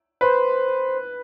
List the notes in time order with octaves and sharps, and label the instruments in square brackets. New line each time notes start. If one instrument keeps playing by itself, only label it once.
[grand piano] B4 [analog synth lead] C5